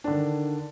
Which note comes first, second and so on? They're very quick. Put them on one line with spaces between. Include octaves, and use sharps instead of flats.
D4 D3 D#3